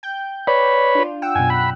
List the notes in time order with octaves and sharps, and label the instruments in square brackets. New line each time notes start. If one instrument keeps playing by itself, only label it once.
[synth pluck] G5 G6
[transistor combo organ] B4 C#5 B5 [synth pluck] D5
[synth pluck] D4 F4
F#5 G5 E6
[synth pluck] F#2 B2 [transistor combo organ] G#5
[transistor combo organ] B5 [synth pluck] F#6